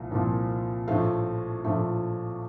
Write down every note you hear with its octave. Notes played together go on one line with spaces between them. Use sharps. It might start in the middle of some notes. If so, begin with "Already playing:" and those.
Already playing: C2 A#2 F3
C2 A#2 F3
A#1 A2 F3 A3 F5
A#1 A2 F3 A3